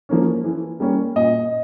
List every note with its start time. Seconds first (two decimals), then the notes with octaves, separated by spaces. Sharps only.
0.09 F3 A#3 C#4
0.44 E3
0.80 G3 A#3 C#4
1.16 A#2 D#5